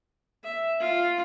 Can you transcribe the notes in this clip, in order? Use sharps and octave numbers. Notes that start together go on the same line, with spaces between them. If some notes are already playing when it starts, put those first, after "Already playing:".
E5
F4